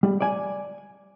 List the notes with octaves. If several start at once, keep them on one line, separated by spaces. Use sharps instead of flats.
G3
D5 G#5